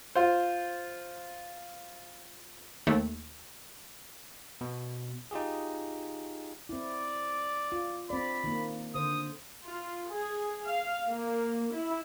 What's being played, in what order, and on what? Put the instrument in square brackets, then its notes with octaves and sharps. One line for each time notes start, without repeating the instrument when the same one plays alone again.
[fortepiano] F4 C5
[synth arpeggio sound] D#2 A3
[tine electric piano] B2
D#4 F4 G4 G#4
[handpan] C4 E4 [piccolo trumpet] D5
[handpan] F4
[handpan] C4 D5 [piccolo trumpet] B5
[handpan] D#3 A#3
[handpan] D3 C5 [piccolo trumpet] D#6
[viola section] F4
G#4
F5
A#3
E4